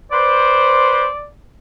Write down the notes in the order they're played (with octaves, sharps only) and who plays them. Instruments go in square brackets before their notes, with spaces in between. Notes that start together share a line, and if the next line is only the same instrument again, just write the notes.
[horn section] B4 C5 [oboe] D5